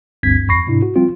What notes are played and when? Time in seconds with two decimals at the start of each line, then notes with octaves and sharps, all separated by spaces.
0.23 G1 D2 G2 C4 G#6 B6
0.49 F2 B5 C#6 A#6 C7
0.67 G#2 C3 D4 E4
0.82 F#4
0.96 F3 G3 C4 F4